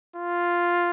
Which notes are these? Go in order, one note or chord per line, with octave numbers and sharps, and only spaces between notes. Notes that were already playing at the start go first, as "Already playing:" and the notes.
F4